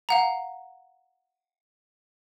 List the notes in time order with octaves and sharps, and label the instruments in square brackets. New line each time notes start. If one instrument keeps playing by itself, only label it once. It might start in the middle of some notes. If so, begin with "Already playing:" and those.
[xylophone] F5 F#5 A#5